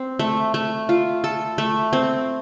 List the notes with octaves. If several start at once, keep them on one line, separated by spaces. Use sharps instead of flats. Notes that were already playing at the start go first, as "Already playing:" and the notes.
Already playing: C4
A3
A3
F4
A4
A3
C4